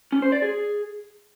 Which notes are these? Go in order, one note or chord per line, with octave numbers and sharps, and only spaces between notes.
C#4
C5
D5
G#4